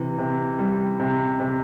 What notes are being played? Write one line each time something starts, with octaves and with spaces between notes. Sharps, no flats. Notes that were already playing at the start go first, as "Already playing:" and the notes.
Already playing: C3 E3
C3
G3
C3
C3